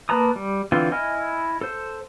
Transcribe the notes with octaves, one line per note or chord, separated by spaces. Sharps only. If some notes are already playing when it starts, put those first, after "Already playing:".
A#3 B4 A5 A#5 D#6
G3
D3 E3 C4 F4
E4 D#5 G#5 F6
A4 C5